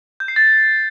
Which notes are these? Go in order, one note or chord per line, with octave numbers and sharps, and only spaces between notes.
G6
C7
A6